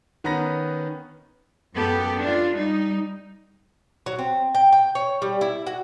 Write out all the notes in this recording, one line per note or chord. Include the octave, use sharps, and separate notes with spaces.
D#3 B3 C#4 B4 A#5 A#6
F#2 B3 G4 A4
D4 F4
G3 D#4
F#3
C4
G5
G5
C#5
G3
E4
F#4